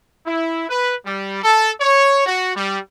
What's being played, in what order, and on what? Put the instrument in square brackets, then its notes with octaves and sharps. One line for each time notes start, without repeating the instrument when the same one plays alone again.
[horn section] E4
B4
G3
A4
C#5
F#4
G3